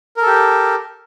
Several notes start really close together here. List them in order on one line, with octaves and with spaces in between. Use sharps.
A#4 A4 G4